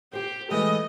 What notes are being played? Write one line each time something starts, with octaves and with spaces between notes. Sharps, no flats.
G4 C5 G5
E3 G#3 A3 D#5